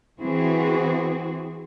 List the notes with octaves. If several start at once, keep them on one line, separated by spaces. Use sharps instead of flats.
E3 C4 F#4 G#4